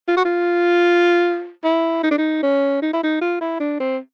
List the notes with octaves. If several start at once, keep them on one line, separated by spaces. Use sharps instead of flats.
F4
F#4
F4
E4
D#4
D4
D#4
C#4
D#4
E4
D#4
F4
E4
D4
C4